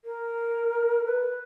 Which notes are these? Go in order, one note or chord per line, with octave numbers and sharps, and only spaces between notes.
A#4
B4